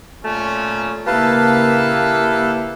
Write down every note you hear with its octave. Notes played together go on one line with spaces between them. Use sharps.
A#2 A3 C#4
C#3 A#3 E4 G4 A4 B4 F5 A5